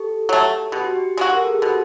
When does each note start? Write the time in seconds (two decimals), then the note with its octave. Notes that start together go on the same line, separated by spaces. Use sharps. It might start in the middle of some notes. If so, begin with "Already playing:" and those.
Already playing: G4 A4
0.29 F#3 A3
0.72 B2 G4
0.84 F#4
0.96 G4
1.17 G#3 C#4 F#4
1.33 A#4
1.40 A4
1.47 G#4
1.54 G4
1.62 B2 F#4